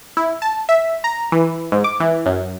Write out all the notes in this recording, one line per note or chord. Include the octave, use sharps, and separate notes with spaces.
E4
A5
E5
A#5
E3
G#2
D6
E3
F#2